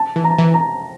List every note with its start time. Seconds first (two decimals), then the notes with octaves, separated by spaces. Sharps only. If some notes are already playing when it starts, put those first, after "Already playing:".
Already playing: A5
0.16 E3
0.24 A#5
0.38 E3
0.54 A#5